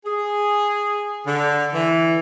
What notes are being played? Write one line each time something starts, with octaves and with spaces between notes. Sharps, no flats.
G#4
D3
E3